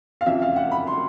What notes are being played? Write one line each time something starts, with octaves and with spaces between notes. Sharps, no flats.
F5
F2 C#3 F3 E5
F5
F#5
B5
C6